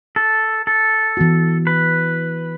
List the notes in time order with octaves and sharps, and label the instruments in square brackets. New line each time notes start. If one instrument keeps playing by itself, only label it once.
[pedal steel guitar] A4
A4
[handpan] E3 B3 F#4
[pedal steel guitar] B4